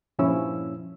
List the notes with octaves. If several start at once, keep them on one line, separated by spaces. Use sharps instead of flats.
G2 A#2 F3 C#4 E4 E6